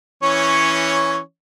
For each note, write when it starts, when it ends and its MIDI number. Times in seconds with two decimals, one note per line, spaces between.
0.23 1.20 52
0.23 1.20 61
0.23 1.20 73